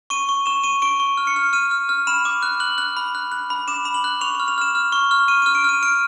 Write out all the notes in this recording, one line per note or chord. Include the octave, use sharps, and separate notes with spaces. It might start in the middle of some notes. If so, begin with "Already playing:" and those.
C#6 D#7
C#6
C#6 E7
C#6 D#7
C#6 D7
C#6
F6
C#7
F6
F6 D#7
F6
F6
B5 E7
D6
F#6
F#6 F#7
F#6
B5
F#6
F#6
B5
D6 E7
B5
F#7
F#6
C#6 F7
F7
F6
F7
F6 E7
F6
C#6
F6
C#6 D#7
F6 D#7
D7
F6 D#7
F6 D7